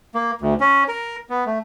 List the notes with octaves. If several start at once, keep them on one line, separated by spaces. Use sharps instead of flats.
A#3
D2
C#4
A#4
B3
A3